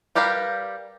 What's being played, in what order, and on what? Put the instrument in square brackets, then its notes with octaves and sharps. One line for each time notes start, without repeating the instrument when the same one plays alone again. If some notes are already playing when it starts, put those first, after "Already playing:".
[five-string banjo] G3 G4 A#4 B4 F5